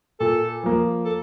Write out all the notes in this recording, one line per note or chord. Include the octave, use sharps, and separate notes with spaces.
A#2 A4
F3 A#3
A4